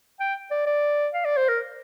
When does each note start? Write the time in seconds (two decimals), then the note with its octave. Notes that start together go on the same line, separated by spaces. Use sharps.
0.20 G5
0.51 D5
0.66 D5
1.14 F5
1.25 D5
1.37 C5
1.48 A#4